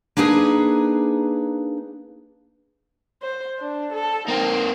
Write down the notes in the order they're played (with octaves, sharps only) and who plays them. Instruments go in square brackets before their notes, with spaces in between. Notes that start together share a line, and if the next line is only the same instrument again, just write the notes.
[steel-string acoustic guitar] A#3 D4 D#4 G#4 B4
[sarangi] C5
D4
A4
[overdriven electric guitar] A#3 C4 [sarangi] D#4